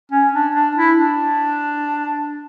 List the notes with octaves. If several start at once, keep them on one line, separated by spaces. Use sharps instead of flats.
C#4
D4
D4
E4
D4